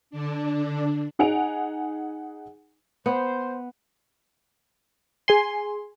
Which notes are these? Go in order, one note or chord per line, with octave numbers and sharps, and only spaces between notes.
D3 D4
D#4 G#4 F#5 G#5 D7 F7
B3 C5
G#4 G#5 C6